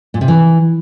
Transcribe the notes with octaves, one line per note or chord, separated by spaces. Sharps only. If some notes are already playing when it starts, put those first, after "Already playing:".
A#2
C3
E3